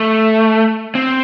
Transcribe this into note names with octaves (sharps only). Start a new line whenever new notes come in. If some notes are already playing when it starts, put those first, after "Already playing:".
Already playing: A3
C4